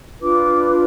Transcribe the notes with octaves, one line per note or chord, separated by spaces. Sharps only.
D4 F4 B4 D6